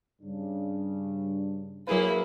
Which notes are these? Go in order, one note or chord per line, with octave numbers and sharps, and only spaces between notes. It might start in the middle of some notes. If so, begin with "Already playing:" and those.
G2 C#3 D4
F#3 A#3 E4 G#4 B4